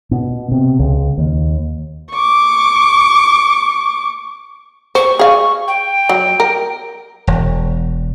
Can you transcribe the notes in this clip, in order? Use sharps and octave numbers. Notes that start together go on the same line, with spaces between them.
B2
C3
C#2
D#2
C#6 D6
C5 C#6
G#4 F5
G5
F#3
A#4
E1